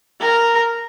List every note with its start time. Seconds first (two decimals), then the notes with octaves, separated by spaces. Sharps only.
0.20 A#4